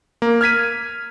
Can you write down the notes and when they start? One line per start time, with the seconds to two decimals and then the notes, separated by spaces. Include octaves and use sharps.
0.22 A#3
0.41 F6 G#6 B6 D#7